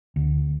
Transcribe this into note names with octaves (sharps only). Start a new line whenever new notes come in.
D2